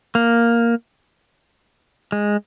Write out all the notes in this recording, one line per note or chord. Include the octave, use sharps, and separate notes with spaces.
A#3
G#3